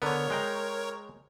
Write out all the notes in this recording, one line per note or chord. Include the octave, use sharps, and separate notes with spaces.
D3 B3 A#4 C#5
G#3 G5 A#5